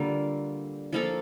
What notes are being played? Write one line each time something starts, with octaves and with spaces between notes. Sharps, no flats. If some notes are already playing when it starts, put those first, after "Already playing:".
Already playing: D3 G3 A#3 F4
F3 A#3 F4 A4